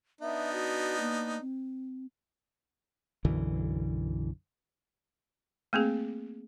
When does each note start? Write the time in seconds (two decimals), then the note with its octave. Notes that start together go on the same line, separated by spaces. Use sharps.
0.21 B3 D4 D#4 E5
0.53 F#4
1.00 A#3
1.41 C4
3.25 B1 F#2 D3 E3
5.73 A3 A#3 C4 G#4